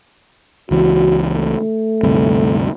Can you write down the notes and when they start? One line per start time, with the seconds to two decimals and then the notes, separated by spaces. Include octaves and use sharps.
0.71 C#2 E3 F#4
1.35 A3
2.03 D2 G2 C3